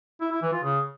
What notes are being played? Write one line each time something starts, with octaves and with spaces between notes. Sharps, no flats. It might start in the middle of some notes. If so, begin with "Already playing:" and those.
E4
E4
E3
F4
C#3